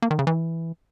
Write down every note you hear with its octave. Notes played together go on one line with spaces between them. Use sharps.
A#3
D#3
C#3
E3